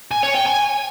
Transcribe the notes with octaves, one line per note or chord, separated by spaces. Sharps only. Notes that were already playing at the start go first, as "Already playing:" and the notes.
G#5
C#5
G5
G#5